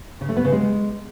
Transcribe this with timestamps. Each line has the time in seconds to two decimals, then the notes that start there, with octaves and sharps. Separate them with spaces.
0.21 C#3
0.29 A3
0.37 B3
0.44 C#3
0.52 G#3